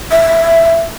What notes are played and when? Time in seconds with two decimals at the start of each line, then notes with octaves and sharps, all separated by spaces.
0.12 E5